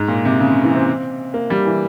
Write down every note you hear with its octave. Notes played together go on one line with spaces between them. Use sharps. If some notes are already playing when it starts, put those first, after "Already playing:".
Already playing: G#2
A#2
C3
C#3
C#3
E3
C4
A#3
G3
E3